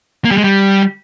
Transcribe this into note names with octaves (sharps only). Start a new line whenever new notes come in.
A#3
G3
G#3
G3